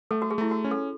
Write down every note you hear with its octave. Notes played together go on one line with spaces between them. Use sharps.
A3 A4
F#4
G#4
A3 E4
F#4
C#4
A4